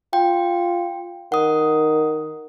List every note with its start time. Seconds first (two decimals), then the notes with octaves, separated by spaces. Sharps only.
0.13 F4 G5
1.32 D#3 F#5 D#6